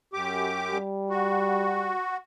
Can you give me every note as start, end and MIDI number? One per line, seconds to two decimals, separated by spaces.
0.13 0.78 42
0.13 0.78 67
0.13 0.78 86
0.74 1.92 55
1.10 2.17 66